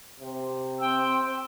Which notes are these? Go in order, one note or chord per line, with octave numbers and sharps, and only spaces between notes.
C3
C4 G5 E6